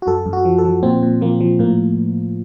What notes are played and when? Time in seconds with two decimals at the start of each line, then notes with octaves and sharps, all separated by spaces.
0.02 F#4
0.07 F#2 A4
0.26 F#2
0.33 F#4
0.45 F3
0.58 A4
0.65 F3
0.83 A#2 C4
1.03 A#2
1.21 F3 A#3
1.40 F3
1.59 A2 A#3